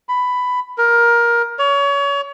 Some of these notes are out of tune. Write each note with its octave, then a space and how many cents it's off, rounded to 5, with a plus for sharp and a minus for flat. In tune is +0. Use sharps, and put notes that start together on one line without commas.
B5 +10
A#4 +15
C#5 +30